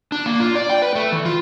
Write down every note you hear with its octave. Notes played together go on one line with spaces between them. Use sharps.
D4
A#3
F4
D5
G5
B4
A3
E3
F4